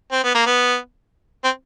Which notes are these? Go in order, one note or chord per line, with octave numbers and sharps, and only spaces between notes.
C4
B3
A#3
B3
C4